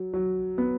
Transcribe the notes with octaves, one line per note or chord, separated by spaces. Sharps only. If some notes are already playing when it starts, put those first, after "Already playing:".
Already playing: F#3
F#3
B3